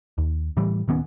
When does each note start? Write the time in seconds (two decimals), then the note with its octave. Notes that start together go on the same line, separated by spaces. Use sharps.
0.18 D#2
0.57 A2 E3 G3
0.88 D1 D#3 B3 C#4